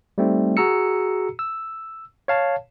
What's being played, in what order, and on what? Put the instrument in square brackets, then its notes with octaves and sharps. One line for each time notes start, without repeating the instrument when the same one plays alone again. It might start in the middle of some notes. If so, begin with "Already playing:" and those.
[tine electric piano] G3 A3 C4 D#4
F#4 G#4 A#5 E6 C#7
E6
C#5 F5 A5